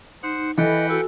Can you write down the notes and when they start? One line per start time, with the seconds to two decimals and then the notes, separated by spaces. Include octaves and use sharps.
0.23 D#4 C5 F#5
0.58 E3 A4 B4 D#5 F#5 G5
0.89 F#4 A4 E6